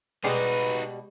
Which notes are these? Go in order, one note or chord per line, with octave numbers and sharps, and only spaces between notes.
B2 G3 G#3 D#4 F#4 G4 B4 F5